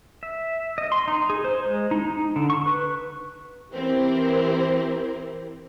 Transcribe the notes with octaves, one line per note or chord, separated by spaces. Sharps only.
E5
D#5
C6
D#4
G#4
C5
G#3
D#4
D#4
D3
C#6
B4
E3 C4 E4 G4 A#4 C5